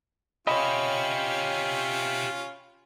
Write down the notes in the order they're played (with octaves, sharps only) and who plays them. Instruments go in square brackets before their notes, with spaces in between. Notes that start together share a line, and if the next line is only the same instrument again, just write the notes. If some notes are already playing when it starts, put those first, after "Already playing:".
[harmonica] C#4 F4 [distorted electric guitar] G4 E5 [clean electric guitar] C#5 D#5 [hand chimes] B5